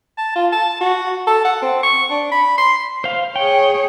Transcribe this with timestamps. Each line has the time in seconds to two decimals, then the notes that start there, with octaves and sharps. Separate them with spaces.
0.18 A5
0.36 F4
0.52 A5
0.81 F#4
1.27 A4
1.45 F#5
1.62 C4
1.83 C#6
2.10 D4
2.32 B5
2.58 C6
3.04 C5 F5
3.36 G#4 C#5 G5